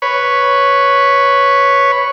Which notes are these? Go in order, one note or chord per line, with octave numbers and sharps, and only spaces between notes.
B4 C#5